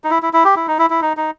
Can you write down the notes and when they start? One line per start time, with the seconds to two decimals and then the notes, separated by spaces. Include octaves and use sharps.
0.04 D#4
0.10 E4
0.22 E4
0.33 E4
0.45 G4
0.56 E4
0.67 D#4
0.79 E4
0.90 E4
1.02 D#4
1.17 D#4